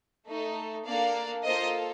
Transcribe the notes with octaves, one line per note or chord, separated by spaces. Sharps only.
A3 D#4 A4
A#3 D4 A4 D5 F5
A#3 F4 A4 C5 D#5